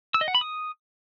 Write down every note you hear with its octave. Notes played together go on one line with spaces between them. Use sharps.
E6
D#5
F#5
B5
D#6